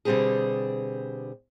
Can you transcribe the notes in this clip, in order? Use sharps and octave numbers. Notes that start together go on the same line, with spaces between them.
B2 D3 G3 C4 G4 G#4